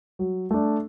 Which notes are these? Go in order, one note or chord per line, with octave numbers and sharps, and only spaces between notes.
F#3
A3 D4